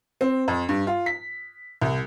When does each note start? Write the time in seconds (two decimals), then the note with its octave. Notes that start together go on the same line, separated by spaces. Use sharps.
0.21 C4
0.48 F2
0.69 G2
0.87 F4
1.06 B6
1.81 C2